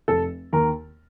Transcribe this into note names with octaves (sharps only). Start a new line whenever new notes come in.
F1 A4
D#2 D#3 A#4